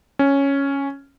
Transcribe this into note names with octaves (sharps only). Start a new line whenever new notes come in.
C#4